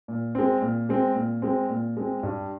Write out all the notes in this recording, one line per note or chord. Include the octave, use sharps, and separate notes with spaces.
A#2
G#3 C4
A#2
G#3 C4
A#2
G#3 C4
A#2
G#3 C4
G2